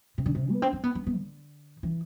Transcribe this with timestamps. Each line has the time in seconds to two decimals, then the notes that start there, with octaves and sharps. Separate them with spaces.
0.18 C3
0.26 D3
0.35 C3
0.51 B3
0.62 C4
0.73 C4
0.84 B3
0.95 B3
1.07 B3
1.16 D3
1.83 E3